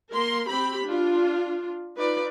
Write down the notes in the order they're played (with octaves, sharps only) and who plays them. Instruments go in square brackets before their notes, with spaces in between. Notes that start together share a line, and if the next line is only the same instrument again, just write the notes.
[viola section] A#3 A#4 C6
C4 G4 B5
D4 F4
D#4 F4 B4 D5